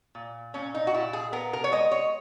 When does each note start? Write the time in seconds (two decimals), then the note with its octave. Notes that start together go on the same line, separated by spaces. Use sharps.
0.15 A#2
0.54 A#2 C#4
0.75 D#4
0.87 F#4
0.94 A#2 E4
1.13 G#4
1.32 B3 A#4
1.53 A#4
1.64 C#5
1.72 G#3 D#5
1.91 C#5